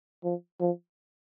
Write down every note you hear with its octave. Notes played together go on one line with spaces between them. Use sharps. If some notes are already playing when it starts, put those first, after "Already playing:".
F3
F3